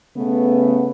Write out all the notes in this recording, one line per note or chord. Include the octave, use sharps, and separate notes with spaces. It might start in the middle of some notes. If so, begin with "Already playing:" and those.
C#3 A3 B3